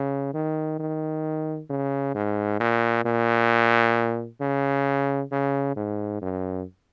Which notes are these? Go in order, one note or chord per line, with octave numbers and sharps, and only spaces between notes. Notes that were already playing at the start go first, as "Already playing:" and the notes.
Already playing: C#3
D#3
D#3
C#3
G#2
A#2
A#2
C#3
C#3
G#2
F#2